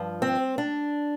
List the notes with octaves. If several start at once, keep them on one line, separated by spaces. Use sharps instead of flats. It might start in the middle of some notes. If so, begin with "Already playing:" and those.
Already playing: G2 F3
C4
D4